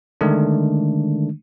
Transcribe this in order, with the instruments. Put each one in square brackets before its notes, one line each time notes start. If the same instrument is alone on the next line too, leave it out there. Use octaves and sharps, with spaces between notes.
[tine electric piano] D3 D#3 G#3 A3 D4